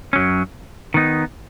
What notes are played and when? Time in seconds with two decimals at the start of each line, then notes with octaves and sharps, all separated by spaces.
0.13 F#2 F#3 C#4
0.94 D#3 B3 D#4